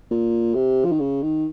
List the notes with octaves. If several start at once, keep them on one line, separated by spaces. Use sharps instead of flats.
A#2
C3
F3
D#3
C#3
D#3